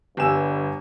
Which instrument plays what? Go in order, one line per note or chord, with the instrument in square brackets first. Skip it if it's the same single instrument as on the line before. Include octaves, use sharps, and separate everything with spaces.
[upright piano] G1 E7 [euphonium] G2 [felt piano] G4 G#5 E6